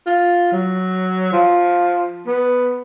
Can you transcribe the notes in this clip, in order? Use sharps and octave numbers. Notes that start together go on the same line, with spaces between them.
F4
F#3
F3
B3